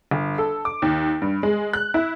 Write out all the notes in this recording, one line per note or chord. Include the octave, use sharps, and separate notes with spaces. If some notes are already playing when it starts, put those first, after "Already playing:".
G1
A4
D6
D#2
G2
G#3
F#6
E4